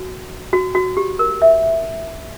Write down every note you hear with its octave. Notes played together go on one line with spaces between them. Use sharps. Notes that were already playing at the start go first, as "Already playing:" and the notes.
Already playing: F#4
F#4
F#4
G4
A#4
E5